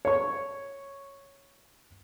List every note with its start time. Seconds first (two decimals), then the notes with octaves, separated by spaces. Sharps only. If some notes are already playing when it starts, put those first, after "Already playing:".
0.05 C#5 C#6